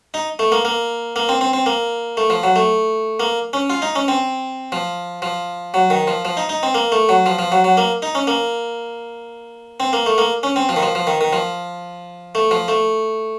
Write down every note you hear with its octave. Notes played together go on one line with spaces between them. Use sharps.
D#4
A3
A#3
A#3
A#3
C4
C4
C4
A#3
A3
F3
F#3
A3
A#3
C#4
F4
D#4
C#4
C4
F3
F3
F#3
D#3
F3
F3
D#4
D#4
C4
A#3
A3
F#3
F3
F3
F#3
F#3
A#3
D#4
C#4
A#3
C4
A#3
A3
A#3
C#4
C4
F3
D#3
F3
F3
D#3
D#3
F3
A3
F3
A3